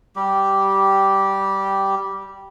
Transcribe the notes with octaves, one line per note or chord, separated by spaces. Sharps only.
G3 G4